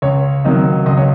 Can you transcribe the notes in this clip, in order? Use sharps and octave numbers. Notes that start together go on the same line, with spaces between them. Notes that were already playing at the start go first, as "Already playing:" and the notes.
C#2 C#5
C3 D#3 F#3 D#5
C#2 D#5
C#5